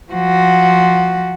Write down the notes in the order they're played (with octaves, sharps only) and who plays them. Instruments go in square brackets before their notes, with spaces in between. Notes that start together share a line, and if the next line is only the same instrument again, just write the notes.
[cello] F3 F#4